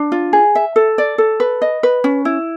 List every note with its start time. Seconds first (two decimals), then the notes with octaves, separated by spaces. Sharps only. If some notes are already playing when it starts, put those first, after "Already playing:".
Already playing: D4
0.12 F4
0.33 G#4
0.55 E5
0.76 A4
0.98 D5
1.18 A4
1.40 B4
1.62 D#5
1.83 B4
2.04 C#4
2.25 E4